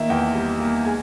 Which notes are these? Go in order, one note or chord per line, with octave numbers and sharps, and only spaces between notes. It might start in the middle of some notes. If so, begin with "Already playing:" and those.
Already playing: D#3 A#3 E5
E2 G5
G3
A#3
G#3 G#5